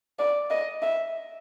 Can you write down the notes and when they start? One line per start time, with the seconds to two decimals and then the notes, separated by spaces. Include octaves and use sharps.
0.19 D5
0.51 D#5
0.82 E5